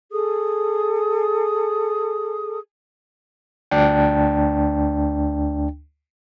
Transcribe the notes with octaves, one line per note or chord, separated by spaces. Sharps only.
G#4 A4 D#6
D2 D4 G5